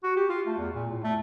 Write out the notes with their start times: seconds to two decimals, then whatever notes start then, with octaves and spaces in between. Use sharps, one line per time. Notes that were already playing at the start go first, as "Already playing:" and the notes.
0.04 F#4
0.16 G4
0.29 F4
0.47 A3
0.58 E2
0.75 A#2
0.90 A2
1.04 A3